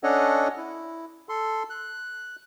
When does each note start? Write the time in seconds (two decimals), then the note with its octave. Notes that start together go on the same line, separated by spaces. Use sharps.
0.03 C#4 D4 A4 C#5 D#5 F#5
0.57 E4
1.29 A4 C6
1.70 F#6